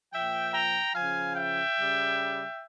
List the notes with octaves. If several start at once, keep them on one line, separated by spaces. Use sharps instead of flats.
A#2 F3 E5 G5
G5 A#5
C#3 F3 F5 G#5
E5 G5
C#3 G3